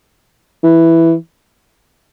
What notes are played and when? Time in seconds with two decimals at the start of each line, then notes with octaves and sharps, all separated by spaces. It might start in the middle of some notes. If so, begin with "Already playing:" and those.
0.63 E3